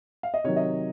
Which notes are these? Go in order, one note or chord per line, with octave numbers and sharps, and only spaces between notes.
F5
D#5
C3 D#3 F#3 C#5
D#5